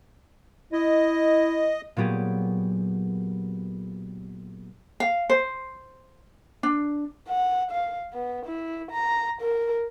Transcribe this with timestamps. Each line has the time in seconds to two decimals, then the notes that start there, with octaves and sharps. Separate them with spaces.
0.73 E4 D#5
1.97 A#2 F#3 B3 G4 G#4
5.00 F5
5.30 C5
6.63 D4
7.28 F#5
7.71 F5
8.13 B3
8.46 E4
8.91 A#5
9.42 A#4